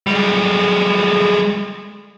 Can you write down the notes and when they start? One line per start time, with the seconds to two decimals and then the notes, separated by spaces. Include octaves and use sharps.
0.07 G3 G#3